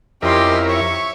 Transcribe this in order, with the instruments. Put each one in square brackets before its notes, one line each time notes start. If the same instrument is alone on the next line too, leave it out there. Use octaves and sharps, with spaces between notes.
[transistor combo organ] F2 E4 A#4 [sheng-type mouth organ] C#4 D#5 [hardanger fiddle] G4 C6
[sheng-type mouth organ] C#5 E5 [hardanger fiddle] C#6